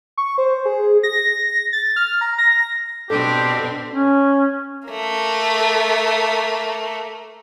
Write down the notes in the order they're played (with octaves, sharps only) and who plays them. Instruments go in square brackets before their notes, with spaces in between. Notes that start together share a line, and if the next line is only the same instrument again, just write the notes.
[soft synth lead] C#6
C5
G#4
A#6
A6
F6
A#5
A#6
[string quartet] B2 C4 [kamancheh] D4 [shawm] G4 [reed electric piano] A4
[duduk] C#4
[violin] A3 A#3